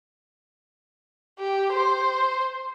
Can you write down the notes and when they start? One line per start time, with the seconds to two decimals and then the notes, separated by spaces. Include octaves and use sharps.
1.39 G4
1.72 C5